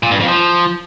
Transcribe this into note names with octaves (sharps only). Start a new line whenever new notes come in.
A#2
G2
F2
F3